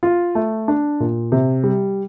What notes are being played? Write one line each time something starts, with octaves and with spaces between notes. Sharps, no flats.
F4
A3
D4
A#2
C3
G3